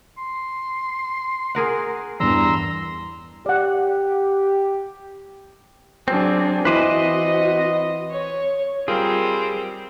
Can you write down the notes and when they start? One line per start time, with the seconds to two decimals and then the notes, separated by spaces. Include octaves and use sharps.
0.18 C6
1.55 G#4 A#4 F#5
2.20 E2 G2 A#5 C6 E6
3.46 G4 D5 F#5
6.08 F#3 C4 D4 G#4
6.65 E3 C4 F#4 B4 C5 D#5 D6 D#7
8.10 C#5
8.88 G3 C4 F4 G4 G#4 A#4